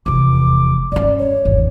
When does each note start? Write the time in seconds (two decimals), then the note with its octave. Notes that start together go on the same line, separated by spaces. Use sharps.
0.06 F1 E2 D6
0.92 G2 C#4 D5
1.18 C#5
1.45 G#1 E2